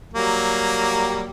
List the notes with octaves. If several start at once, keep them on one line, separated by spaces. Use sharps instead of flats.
F#3 G3 A#3